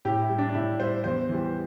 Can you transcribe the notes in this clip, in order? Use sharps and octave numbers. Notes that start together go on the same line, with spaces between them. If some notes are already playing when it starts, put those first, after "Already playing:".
A2 G4
E4
G3
D4
D4
A2 E4
G3 C5
E2 C5
E3 G3